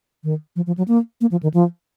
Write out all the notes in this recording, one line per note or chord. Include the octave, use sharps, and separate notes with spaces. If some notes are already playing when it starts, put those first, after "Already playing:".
D#3
F3
F3
F#3
A#3
A#3
F3
D#3
F3